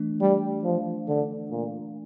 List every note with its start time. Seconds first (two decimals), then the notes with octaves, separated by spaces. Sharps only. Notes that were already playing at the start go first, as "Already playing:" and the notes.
Already playing: E3 A3 D4
0.21 G3
0.64 F3
1.08 D3
1.51 A#2